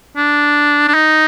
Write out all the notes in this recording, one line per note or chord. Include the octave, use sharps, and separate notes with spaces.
D4
D4
D#4